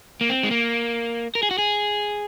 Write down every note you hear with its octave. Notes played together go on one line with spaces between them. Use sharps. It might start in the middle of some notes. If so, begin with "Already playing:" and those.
A#3
C4
G#3
A#3
A#4
G#4
F#4
G#4